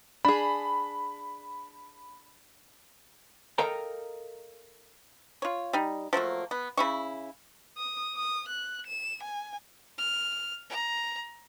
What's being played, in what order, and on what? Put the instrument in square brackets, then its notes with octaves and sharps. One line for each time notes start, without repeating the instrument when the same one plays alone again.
[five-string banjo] D4 G#4 [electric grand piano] B5
[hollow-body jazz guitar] A4 A#4 D#5 F5 G5 A#5
[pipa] F4 C#5
G3 D#4
F3 F#3 A3 A#3
B3
C#3 E4 C#6
[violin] D#6
D#6
F#6
E7
G#5
[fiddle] F6
A#5